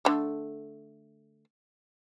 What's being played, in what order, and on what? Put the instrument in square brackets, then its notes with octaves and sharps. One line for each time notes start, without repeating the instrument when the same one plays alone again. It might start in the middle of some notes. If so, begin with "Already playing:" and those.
[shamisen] D3 A3